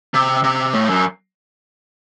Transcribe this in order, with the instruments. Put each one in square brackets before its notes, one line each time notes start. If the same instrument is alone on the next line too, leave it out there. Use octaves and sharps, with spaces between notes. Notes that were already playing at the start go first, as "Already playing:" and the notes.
[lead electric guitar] C3
C3
A2
F#2